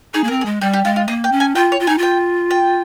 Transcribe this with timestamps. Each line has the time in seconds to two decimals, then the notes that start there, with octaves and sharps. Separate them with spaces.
0.14 D#4 G#4
0.24 A#3
0.28 C4 A#4
0.41 G#4
0.46 G#3
0.61 G3 G4
0.73 G4
0.85 G#3 F4
0.96 F4
1.08 A#3 D#5
1.24 G5
1.32 C#4
1.40 G#5
1.55 F4 G5
1.72 C#5
1.80 F4
1.87 D#4 G#5
1.98 F4 G5
2.51 G5